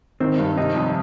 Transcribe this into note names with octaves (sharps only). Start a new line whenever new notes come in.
D#3 C4
G2
C3 D#4
F2